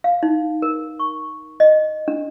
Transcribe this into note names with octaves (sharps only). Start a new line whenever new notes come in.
F5
D#4
A#4
C#6
D#5
D4